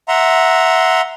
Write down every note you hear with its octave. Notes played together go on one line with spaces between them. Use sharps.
E5 F#5 A#5 C6